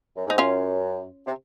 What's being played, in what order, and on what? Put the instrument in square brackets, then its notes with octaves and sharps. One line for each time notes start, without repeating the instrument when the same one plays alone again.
[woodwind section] F#2
[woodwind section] G#2 [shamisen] D#4
[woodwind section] F#2 [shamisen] C#4 F4
[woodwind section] C3